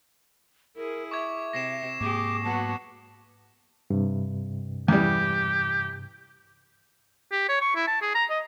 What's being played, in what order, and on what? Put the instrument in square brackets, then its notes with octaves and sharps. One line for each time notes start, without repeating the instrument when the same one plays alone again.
[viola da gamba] E4 G#4 [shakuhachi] A#4
[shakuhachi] E5 [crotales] C#6 D6 G#6
[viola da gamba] C3 [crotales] A#6 C7 E7
[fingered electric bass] G#2 A#3 [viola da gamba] G4 G#4 [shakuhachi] D6
[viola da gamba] F#3 B3 F#4 [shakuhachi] A5
[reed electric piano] G2 C3
[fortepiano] E2 G3 [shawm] G4
[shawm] G4
C#5
C#6
E4
A5
G#4
A#5
D#5